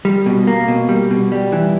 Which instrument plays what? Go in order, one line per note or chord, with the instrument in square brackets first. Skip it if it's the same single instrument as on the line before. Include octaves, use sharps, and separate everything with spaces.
[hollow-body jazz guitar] G3
B2
A#3
B2
G3
B2
G3
E3